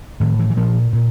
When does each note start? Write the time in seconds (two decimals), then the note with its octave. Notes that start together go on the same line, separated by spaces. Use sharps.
0.20 A2 D#3
0.39 E3
0.50 E3
0.57 A#2 F3
0.93 A#2